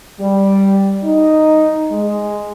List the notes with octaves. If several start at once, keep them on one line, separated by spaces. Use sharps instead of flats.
G3
D#4
G#3